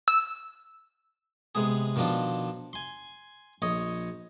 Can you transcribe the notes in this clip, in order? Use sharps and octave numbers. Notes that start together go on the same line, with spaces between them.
E6
C3 G#3 B3 G#4
B2 D#3 F3 D4 F4
G#5 C6
A#1 C#5 D#5